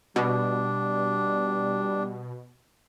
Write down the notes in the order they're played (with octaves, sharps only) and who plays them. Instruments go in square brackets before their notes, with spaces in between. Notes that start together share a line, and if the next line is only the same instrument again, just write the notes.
[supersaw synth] B2 [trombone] G3 [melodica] D4